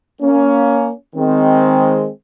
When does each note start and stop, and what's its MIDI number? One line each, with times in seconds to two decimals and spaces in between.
0.21 0.91 58
0.21 0.91 61
1.16 2.08 51
1.16 2.08 56
1.16 2.08 60